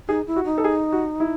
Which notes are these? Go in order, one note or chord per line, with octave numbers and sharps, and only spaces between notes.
D#4 G#4
E4
F#4
D#4
A4
G#4
F#4
E4